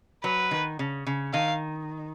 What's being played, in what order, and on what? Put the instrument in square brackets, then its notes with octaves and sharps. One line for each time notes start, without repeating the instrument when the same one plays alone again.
[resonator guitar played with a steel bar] F#3 [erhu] B4
[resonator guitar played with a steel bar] D#3
C#3
C#3
[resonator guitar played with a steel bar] D#3 [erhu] F5